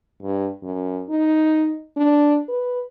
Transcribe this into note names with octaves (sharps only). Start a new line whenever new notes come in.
G2
F#2
D#4
D4
B4